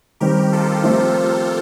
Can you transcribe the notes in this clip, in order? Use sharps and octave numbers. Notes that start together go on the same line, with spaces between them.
D#3 G3 C4 G4 A#4
F4 A4
F3 A3 C4 F4 G4 A#4